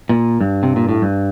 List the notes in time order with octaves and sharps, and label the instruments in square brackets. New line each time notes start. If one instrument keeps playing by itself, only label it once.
[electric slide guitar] A#2
G2
C3
A#2
A2
G2